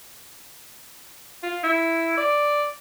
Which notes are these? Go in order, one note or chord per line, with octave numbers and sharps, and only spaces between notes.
F4
E4
D5